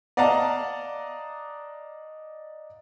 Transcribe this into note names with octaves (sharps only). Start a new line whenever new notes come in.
D5 D#5 F5 F#5 A5 A#5